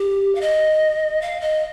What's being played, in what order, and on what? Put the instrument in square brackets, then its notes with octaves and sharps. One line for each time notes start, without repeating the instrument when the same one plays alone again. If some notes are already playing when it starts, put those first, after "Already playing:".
Already playing: [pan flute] G4
F5
D#5
F5
D#5